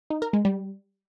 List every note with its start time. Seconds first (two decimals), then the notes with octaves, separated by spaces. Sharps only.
0.10 D#4
0.22 A#4
0.33 G#3
0.45 G3